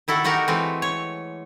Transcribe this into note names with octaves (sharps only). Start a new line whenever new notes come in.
D#3 E4 F#4 A4
A3 D#4 F#4 G4 A#4
E3 G#3 A3 C4
C#5